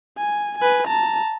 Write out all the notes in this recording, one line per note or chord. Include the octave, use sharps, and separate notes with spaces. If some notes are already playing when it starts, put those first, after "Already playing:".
G#5
B4 G#5
A5 A#5